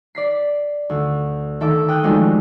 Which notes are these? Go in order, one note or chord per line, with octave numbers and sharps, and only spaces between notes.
D5 B6 C7
D2
D#3 A4 E5 D6
G5 D#6 F#6 G6
F3 F#3 G#3 A3 D4 D#4